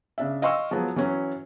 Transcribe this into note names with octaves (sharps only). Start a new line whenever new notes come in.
C#3 D4 E5
D#5 F5 G5 C6 C#6 E6
F3 F#3 G#3 B3
E3 F#3 C#4